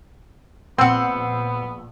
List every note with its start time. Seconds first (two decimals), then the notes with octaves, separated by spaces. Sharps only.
0.78 A#1 B3 C4 C5 F#5 E6